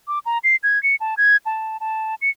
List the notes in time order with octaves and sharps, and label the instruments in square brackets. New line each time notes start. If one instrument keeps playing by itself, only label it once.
[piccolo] D6
A#5
C7
G#6
C#7
A5
G#6
A5
A5
C#7